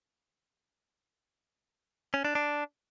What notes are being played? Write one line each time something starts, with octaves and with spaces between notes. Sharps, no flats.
C#4
D4
D4